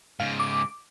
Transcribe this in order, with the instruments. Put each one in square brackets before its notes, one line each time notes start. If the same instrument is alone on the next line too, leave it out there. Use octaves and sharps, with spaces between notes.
[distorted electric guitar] G#2 C#3 [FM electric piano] F5
[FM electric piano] D6